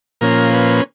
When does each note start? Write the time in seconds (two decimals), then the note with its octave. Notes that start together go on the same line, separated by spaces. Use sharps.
0.21 A#2 F3 A#3 C#4 A#4
0.53 B4